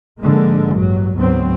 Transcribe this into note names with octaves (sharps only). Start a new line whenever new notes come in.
G#2 D3 F3 G#3 A#3
A1 G2 F#3
D2 G#2 F#3 B3 C4